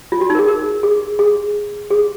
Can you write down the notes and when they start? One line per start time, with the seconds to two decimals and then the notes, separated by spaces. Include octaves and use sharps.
0.12 F4
0.21 F#4
0.30 D#4
0.35 A#4
0.39 G#4
0.48 A#4
0.83 G#4
1.19 G#4
1.91 G#4